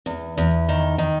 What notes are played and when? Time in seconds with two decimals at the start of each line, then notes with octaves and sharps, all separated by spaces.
0.06 E2
0.37 E2
0.69 D#3
0.98 D#3